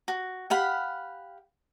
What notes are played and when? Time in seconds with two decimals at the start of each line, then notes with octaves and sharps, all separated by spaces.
0.08 F#4
0.50 G4 F5 F#5 B5